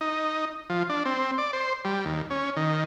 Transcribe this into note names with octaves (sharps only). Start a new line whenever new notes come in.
D#4
F3
D4
C4
D5
C5
G3
D#2
C#4
D#3